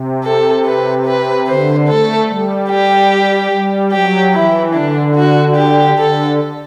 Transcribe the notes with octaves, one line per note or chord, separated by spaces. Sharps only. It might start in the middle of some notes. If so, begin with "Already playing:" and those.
Already playing: C3
A4
B4
B4
D3 C5
A3 A4
G3
G4
G3
F#3 G4
E3 E4
D3 D4
F#4
G4
D3 A4